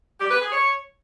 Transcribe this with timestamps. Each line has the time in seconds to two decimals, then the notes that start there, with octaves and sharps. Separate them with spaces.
0.20 G4
0.30 B4
0.41 G#4
0.52 C#5